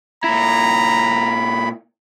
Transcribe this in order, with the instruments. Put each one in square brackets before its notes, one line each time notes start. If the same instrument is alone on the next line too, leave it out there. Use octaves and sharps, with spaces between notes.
[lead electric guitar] A#2 E4 [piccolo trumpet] A#5 [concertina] B5